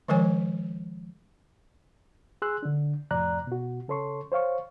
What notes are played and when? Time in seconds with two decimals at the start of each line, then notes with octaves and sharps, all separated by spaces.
0.08 D#3 F3 G#3 A#4 C#5 G#5
2.42 G#4 C6 E6 F#6
2.63 D3 D4
3.11 F2 A2 C3 D5 A#5 F#6
3.47 B2 F#4
3.88 C#3 A4 C#5 C6 C#6
4.32 C5 C#5 F5 C#6